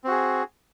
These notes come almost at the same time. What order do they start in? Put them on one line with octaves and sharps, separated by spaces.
C4 F#4 G#4